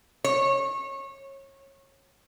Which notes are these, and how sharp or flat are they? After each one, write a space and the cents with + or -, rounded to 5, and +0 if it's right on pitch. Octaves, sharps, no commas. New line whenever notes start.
C#5 -25